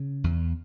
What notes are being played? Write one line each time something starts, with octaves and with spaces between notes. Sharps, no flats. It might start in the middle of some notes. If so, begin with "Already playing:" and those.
Already playing: C#3
E2